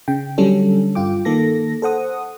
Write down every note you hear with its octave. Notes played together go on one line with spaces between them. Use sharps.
C#3 G5
D3 F#3 G3 C#4 A4
G2 F4 G5 D6
D#3 A#3 A4 A#6
A4 C5 F#5 D#6